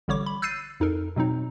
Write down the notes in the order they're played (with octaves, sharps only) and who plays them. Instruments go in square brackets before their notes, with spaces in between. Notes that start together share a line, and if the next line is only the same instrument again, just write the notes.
[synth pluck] A1 D3 G3 C#5 C#6 D6
B5
E6 F#6 G6 A6 C7 D#7
F2 D#4 A4 A#4
B2 F#3 C4 D#4